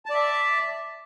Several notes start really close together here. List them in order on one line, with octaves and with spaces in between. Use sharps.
A5 D5 E5